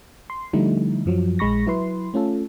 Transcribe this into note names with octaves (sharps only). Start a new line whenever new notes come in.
C6
D3 F3 G3 A3 D#4 E4
F#2 F3 F#3
A#1 G#3 B5 C#6 A#6
F#3 E4 B4 C6
A3 C#4 F4 A4